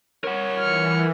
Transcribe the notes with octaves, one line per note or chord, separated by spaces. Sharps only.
A#4 C#5 F#5
E3 F6 C#7